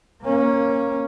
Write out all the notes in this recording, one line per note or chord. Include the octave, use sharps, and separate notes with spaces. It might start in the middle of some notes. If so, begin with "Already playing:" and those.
A#3 C#4